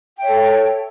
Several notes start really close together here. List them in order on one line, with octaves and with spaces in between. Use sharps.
G5 E5 C#5 A4